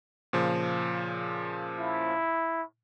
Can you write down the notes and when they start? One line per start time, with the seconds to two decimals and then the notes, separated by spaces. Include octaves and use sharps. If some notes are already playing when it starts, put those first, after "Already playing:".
0.33 A#2 C#3 F3
1.79 E4